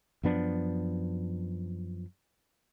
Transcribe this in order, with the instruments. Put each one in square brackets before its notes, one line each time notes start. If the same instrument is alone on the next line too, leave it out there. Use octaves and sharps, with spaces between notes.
[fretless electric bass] F#2 F3 B3 D4